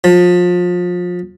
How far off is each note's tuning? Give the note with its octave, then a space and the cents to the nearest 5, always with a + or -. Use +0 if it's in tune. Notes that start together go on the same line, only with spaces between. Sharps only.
F3 +30